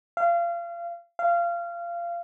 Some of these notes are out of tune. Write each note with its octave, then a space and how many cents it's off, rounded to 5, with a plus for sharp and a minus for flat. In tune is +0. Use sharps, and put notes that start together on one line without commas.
F5 -30
F5 -25